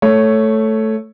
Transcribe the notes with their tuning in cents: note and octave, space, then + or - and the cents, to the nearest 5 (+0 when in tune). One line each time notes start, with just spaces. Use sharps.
A3 +0 C#5 +0